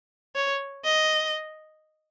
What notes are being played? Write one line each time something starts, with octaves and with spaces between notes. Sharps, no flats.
C#5
D#5